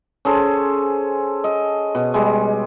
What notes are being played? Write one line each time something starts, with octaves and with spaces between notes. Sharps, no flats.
C#4 G#4 A4 C5
D#5
B2
G3 G#3